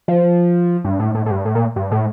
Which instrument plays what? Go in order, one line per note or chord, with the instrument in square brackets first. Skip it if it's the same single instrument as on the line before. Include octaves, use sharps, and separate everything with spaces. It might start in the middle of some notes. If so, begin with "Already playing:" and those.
[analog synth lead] F3
G2
A2
A2
A2
G2
A2
A#2
G2
A2